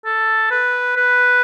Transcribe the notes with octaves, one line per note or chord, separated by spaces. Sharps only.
A4
B4
B4